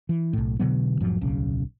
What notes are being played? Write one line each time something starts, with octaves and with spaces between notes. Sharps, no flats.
E3
B1 A2
B2 D3 F#3 B3
E1 G#2 F3 F#3
D1 B1 C#3